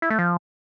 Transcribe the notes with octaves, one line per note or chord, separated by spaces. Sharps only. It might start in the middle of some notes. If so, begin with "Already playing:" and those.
E4
A3
F3